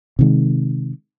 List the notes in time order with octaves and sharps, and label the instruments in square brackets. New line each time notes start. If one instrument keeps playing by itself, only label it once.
[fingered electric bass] C3 D#3 G#3